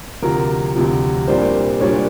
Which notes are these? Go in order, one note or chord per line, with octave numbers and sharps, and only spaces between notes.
D2 C3 F3 A#4
D2 C3 F3
C2 A#2 G3 A#3 D4 C5
A#2 G3 A#3 D4 C#5